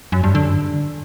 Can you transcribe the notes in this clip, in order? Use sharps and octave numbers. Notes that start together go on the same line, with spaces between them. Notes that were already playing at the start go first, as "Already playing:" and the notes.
F#2
G2
D3